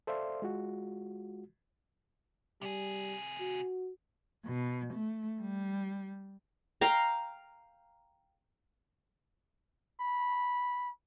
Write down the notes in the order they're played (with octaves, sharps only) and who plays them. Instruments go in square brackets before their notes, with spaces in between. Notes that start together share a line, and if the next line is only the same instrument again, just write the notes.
[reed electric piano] A4 C5 D5 E5 F5 C6
G#3 F4 F#4
[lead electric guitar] C3 G#4 [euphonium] G3
[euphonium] F#4
[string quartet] B2
A3
G3
[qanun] F5 G5 A#5
[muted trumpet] B5